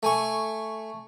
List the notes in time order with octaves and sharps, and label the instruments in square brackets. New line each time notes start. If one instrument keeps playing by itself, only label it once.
[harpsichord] A3 G#5 C#6